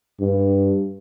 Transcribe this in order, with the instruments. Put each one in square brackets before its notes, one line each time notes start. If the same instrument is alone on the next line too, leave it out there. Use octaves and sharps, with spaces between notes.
[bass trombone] G2